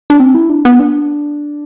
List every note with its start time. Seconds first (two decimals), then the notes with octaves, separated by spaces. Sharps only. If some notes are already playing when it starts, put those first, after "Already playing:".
0.10 D4
0.20 C4
0.35 E4
0.50 D4
0.65 B3
0.79 D4